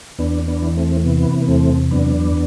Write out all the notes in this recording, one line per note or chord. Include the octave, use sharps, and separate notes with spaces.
E2 B3 D4
B3 D4
E3
A3 C4
A3
C3 B3
B3
E2 A3 C4
F#2 B3 D4